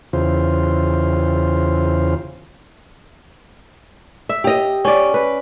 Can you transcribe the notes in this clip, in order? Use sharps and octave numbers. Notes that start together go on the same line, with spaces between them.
E2 C#3 F4 C5
E5
G4 D#5
C#4 D5
B4